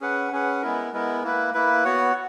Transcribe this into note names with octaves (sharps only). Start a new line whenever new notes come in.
C#4 G#4 B4 F#5
C#4 G#4 B4 F#5
G#3 B3 E4 A#4
G#3 B3 E4 A#4
A#3 E4 B4
A#3 E4 B4
B3 F#4 C#5 F#5